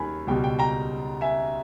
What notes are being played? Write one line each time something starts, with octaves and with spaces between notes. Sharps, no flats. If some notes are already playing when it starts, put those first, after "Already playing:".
Already playing: D#2 D#3 G3 G#5 B5
C#2 B2 G3 G5
G5
G5 A#5
E5 G#5